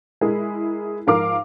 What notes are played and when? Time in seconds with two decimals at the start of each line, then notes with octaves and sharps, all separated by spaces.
0.21 G#3 E4 G#4 A#4
1.07 G#2 F3 A#4 F5 D6